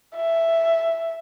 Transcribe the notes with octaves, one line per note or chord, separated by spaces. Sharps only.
E5